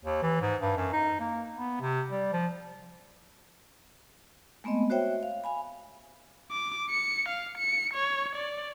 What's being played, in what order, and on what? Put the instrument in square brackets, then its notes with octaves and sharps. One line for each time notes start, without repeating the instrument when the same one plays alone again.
[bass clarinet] D#2
E3
G#2
G2
F#2
D#4
A#3
B3
C3
G3
F3
[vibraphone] G#3 A3 B3 C4 D#5
F#4 C5 C#5 E5 G5
F5
F5 G#5 B5
[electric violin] D6
C#7
F5
C#7
C#5
D5